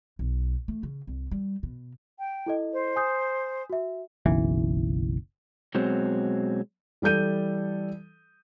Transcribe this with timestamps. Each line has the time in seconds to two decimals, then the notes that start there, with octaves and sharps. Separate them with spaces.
0.19 B1
0.68 A3
0.83 C#3
1.07 C2
1.31 G3
1.63 B2
2.19 G5
2.46 E4 A4 D#5
2.73 C5
2.96 G#5 D#6 G6
3.70 F#4 E5
4.26 F#1 B1 E3
5.75 B2 F#3 G#3 C4
7.02 E3 G3 A4 G6 D#7